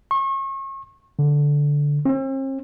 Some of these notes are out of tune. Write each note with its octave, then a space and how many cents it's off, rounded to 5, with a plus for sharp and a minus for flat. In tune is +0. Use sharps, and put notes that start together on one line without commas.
C#6 -35
D3 -10
C4 +45